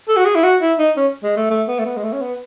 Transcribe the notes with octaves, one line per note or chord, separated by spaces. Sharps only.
A4
F#4
G#4
E4
F#4
E4
D#4
C#4
G#3
A3
A3
B3
A3
B3
G#3
A3
C#4
B3